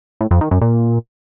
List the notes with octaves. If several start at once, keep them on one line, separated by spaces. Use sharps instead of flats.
A2
F2
D#3
F#2
A#2